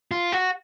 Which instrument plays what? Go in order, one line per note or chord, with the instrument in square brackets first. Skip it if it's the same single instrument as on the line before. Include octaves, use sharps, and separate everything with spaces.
[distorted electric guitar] F4
F#4